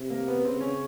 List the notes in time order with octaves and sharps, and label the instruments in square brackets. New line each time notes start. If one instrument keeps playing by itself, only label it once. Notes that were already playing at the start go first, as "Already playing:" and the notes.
Already playing: [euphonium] C3
[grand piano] A#3
B3
[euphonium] C#3 [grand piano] C4
[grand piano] C#4